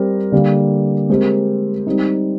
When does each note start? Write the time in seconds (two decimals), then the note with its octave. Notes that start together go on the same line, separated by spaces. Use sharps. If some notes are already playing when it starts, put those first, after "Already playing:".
Already playing: G3 C4 G4 A#4
0.32 D3 G3 A#3
1.09 G#3 C4 G4 A#4
1.87 G3 C4 D#4